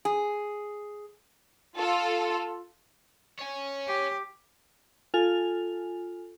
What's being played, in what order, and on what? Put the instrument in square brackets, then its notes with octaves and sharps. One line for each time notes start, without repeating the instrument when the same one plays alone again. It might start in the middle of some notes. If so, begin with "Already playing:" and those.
[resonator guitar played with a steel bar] G#4
[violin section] F4 A4
[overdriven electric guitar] C#5 G#5
[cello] G4
[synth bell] F4 A4 G#5 F7